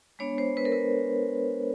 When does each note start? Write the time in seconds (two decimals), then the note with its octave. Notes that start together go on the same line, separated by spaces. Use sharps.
0.19 G#3 B3 D4 C#5
0.38 C5
0.57 B4
0.65 A#4
0.72 B4